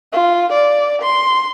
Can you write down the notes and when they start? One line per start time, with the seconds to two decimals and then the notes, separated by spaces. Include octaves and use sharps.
0.13 F4
0.52 D5
1.02 C6